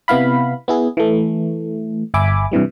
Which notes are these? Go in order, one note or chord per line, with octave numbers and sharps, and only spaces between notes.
C3 B3 E4 F5 B5
B3 E4 G#4
E3 A3
G1 E5 G#5 B5 D6
G2 C3 E3 G3